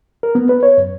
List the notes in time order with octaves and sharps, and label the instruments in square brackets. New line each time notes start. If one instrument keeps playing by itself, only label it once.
[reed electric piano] A#4
B3
B4
C#5
F#2